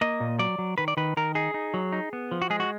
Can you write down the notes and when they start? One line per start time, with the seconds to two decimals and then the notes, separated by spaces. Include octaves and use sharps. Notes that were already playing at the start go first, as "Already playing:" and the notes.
0.01 A#3 D#5
0.20 A#2
0.39 F#3 D5
0.58 F#3
0.78 D#3 B4
0.88 D5
0.97 D#3 B4
1.17 D#3 A#4
1.35 D#4 G#4
1.54 D#4
1.74 F#3
1.92 D#4
2.13 B3
2.31 F3
2.42 F#4
2.50 G#3 G#4
2.60 F#4